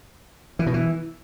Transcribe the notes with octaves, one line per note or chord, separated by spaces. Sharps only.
E3
B2
E3